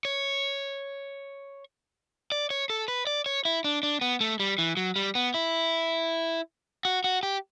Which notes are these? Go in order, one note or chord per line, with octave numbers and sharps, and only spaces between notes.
C#5
D5
C#5
A4
B4
D5
C#5
E4
D4
D4
B3
A3
G3
E3
F#3
G3
B3
E4
F#4
F#4
G4